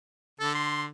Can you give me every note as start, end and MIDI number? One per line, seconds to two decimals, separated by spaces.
0.40 0.88 50
0.40 0.51 69
0.55 0.83 84